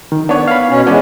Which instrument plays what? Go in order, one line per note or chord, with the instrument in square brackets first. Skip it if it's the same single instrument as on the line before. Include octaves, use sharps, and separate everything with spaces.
[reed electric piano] D#3
[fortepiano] B3 C#5 [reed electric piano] D4
[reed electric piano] F5 B5
[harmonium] B2 C#4
[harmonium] E3 G#3 [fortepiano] B3 C#4 D4